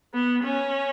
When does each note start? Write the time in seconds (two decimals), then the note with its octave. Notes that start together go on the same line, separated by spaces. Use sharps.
0.14 B3
0.44 C#4